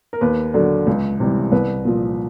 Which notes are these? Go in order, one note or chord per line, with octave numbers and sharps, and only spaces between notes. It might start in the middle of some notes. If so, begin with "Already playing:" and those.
A#4
D#2 B4
D3 F#3
C#2
C3 E3 G3
C2 B4
A#2 F3